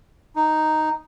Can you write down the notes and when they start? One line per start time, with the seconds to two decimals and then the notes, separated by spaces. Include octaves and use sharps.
0.36 D#4